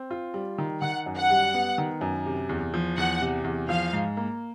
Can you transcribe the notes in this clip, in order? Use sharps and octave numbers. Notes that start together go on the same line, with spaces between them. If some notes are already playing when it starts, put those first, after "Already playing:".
Already playing: C4
F4
G3
D#3
D#3 F#5
F#2
F#5
G3
B3
D#3
F#2
C3
E2
F3
E2 F#5
C3
E2
F3 F5
G#2
A#3